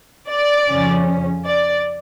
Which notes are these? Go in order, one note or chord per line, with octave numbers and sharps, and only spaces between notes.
D5
F2 C#3 F3 C#4
D5